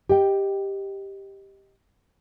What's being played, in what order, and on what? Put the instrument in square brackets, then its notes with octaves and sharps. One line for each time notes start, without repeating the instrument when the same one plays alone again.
[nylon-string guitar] G4 D#5 G5